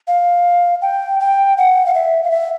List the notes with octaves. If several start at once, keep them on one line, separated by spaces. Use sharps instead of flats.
F5
G5
G5
F#5
F5
E5
F5
E5